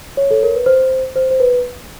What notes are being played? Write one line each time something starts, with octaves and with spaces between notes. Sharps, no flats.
C#5
A4
A#4
B4
C5
C5
C5
B4